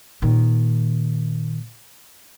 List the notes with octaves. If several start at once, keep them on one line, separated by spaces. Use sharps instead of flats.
A#2 D#3